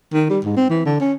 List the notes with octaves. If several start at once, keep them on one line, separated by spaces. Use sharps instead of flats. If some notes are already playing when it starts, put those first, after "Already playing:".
D#3
G3
G#2
C4
E3
D3
C#4